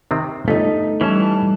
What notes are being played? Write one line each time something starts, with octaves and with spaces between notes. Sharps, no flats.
C3 D#3 C4
G1 A3 D#4
E3 G3 C#4 E4 A5